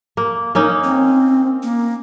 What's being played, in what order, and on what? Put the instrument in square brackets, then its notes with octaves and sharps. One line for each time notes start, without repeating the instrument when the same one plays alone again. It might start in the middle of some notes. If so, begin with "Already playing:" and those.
[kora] A#3
A#3 C#4 D#4
[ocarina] C4
A#3